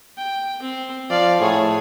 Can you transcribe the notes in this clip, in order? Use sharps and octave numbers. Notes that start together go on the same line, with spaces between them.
G5
C4
F3 D5 F5
A2 G#4 C#5